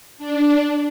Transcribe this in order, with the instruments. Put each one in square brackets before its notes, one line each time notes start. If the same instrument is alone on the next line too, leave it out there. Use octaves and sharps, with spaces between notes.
[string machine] D4